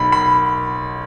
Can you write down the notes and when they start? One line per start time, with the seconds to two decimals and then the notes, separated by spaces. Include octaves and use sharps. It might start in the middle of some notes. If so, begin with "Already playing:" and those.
Already playing: B1 B2 B5
0.12 B5